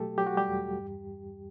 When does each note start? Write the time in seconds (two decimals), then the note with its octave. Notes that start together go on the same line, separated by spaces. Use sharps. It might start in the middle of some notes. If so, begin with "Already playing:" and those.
Already playing: B2 F#3 A3 G4 A4
0.18 F#3 G4
0.27 F#4
0.37 G3 G4
0.47 E2
0.78 G2